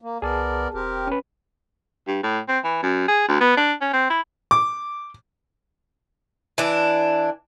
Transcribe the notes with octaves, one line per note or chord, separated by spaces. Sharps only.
A#3
C2 B3 G#4 A#4 D5 A5
E1 C4 G4 A#4
C#4 B4
G2
A2
C4
E3
F#2
G#4
D2
B3
D4
C#4
C4
E4
D6
E3 D4